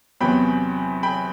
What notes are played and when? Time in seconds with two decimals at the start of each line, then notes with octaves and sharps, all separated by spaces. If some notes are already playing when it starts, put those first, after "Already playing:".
0.21 E2 C3 F#3 B3 G5 B5
1.03 G5 B5